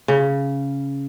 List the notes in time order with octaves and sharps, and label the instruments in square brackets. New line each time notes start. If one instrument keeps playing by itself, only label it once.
[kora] C#3